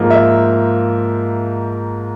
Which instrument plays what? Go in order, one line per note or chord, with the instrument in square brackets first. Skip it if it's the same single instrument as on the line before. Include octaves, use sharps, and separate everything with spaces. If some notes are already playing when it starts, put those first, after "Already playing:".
Already playing: [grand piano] G#2 F3 A#3
E5